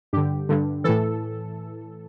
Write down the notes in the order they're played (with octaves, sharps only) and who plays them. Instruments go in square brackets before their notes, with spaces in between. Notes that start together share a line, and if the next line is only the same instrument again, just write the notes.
[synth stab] G2 D3 G4
G2 D3
A2 E3 A4